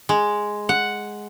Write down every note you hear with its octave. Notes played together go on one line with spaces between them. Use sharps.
G#3
F#5